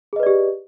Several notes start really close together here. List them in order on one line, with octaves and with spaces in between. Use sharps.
G#4 D#5 B4 D5 G4